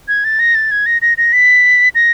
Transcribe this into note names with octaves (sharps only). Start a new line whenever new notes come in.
G#6
A6
A#6
A6
G#6
A#6
A#6
A#6
B6
A#6